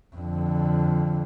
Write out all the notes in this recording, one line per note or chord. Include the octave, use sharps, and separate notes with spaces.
F2 D3